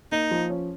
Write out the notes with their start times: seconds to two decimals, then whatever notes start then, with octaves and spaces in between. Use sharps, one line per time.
0.12 A#3 D#4
0.31 F3
0.50 C#4